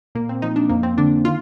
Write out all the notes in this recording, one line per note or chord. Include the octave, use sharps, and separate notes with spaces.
A#2 A#3
C4
F3 D#4
D4
F2 A#3
C4
D3 D4
D#3 F4